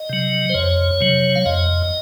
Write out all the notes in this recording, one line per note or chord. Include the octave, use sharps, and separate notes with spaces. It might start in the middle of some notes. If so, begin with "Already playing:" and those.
Already playing: D#5
C3 F#3
C5
F2 C#5
C3 F#3
F5
F2 D#5